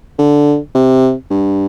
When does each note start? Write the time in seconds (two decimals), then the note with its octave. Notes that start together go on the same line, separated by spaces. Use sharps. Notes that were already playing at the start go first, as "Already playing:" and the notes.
0.19 D3
0.75 C3
1.30 G2